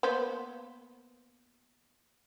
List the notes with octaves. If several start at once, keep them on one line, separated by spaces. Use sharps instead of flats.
A#3 B3 C5